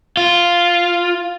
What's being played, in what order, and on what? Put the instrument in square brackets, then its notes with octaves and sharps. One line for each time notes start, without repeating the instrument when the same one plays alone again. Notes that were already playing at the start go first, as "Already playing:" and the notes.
[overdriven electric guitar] F4